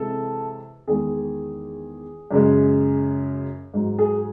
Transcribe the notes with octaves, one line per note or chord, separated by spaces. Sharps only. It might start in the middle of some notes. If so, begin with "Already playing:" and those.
Already playing: C3 E3 G#3 A4
E2 D#3 G#3 G#4
F#2 C#3 G#3
G#2 F#3
G#4